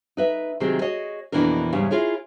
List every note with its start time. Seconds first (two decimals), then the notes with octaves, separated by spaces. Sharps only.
0.17 D#4 B4 E5
0.60 C3 D#3 F#3 C4 G4 G#4
0.81 F#4 G#4 C#5 D#5
1.32 F2 B2 E3 A#3 D4 A#4
1.73 E2 G#2 C#3 G3 C#4
1.90 E4 F4 G#4 A#4 C#5